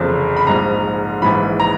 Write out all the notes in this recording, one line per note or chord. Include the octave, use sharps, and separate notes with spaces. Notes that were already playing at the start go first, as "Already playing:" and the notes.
Already playing: F1 E2 C#3 F3
B5
A#1 G#2 F3 A#5
A#1 G#2 E3 B5
A#5